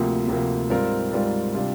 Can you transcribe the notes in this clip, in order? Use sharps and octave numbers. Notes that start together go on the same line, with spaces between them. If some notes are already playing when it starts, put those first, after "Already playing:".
Already playing: D2 C3 F3 A#3
D2 C3 F3 A#3
G#2 G3 C4 F4 A#4
G#2 G3 C4 F4 A#4
C3 G3 D4 F4